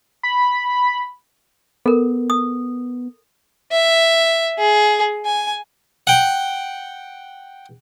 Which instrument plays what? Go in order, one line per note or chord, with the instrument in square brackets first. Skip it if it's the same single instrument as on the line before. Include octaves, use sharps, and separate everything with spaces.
[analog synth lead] B5
[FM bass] B3 [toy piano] A4 A#4
[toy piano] D#6
[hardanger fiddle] E5
G#4
G#5
[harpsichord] F#5 G5